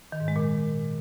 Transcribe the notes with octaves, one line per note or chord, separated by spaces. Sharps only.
D#3
G#2
G#3
A#2